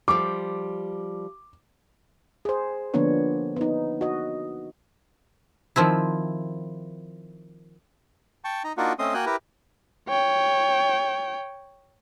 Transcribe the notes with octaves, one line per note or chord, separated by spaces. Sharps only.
F3 G3 D6
G#4 C5
D3 F3 A#3 B3 D4 C#5
B3 D#4
F#4 D#5
D#3 F3 C4 E4
G5 A5 C#6
D#4 A#5
A#3 D4 D#4 F4 F#4 F#5
A3 C4 C#4 D#5 C6 D#6
A#3 F#4 G5 G#5 F#6
E4 G4 A#4 B4
C#5 G5